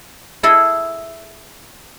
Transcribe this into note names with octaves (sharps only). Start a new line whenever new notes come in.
E4 G#4 A4 D#5 E5